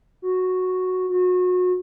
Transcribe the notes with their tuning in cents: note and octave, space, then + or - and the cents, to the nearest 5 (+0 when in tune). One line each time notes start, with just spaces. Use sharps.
F#4 -5
F#4 -30